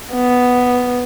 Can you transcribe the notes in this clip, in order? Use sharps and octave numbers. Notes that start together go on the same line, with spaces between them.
B3